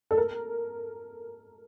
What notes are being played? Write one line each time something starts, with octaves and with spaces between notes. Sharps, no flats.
A4
A#4